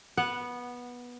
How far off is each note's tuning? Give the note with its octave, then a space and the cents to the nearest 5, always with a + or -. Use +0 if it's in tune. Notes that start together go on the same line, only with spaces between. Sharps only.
B3 -15 F#5 +0